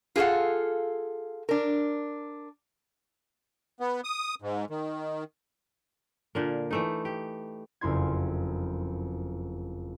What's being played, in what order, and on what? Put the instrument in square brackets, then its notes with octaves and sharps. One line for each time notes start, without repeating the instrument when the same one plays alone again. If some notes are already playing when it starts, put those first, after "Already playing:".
[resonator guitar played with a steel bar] F4 G#4 A4 F5 F#5
D4 A#4
[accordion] B3
D#6
G#2
D#3
[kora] A#2 D3 A#3
E3 A3 D#4
G4
[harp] F#1 F2 E4 C6 G#6